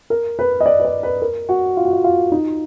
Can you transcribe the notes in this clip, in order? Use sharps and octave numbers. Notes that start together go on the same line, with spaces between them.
A#4
B4
D#5
D5
B4
D5
B4
A#4
F#4
F4
F#4
F4
F4
D#4